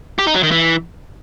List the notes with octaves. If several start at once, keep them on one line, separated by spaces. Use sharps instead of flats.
G4
D#4
F#3
D#3
E3